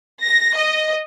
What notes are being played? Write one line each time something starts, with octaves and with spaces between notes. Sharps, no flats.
A#6
D#5